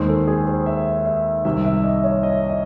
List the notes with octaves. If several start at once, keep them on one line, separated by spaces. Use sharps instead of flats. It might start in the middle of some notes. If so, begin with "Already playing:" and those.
Already playing: D#2 D#3 G#3 C5
A4
G#4
C5
E5
E5
C2 C3 D#3 E5
E5
D#5
C#5
D#5
D#5